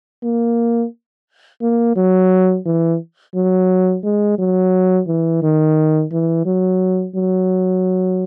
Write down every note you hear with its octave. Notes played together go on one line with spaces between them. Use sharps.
A#3
A#3
F#3
E3
F#3
G#3
F#3
E3
D#3
E3
F#3
F#3